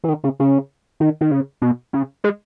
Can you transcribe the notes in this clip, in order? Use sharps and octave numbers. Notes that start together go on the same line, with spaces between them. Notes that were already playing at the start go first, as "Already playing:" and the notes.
E3
D#3
C#3
C#3
D#3
D#3
C#3
B2
C#3
G#3